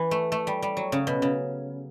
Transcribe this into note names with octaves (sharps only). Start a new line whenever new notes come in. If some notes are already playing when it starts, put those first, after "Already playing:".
Already playing: E3
A3
A3
G3
G3
F#3
C#3
B2
C#3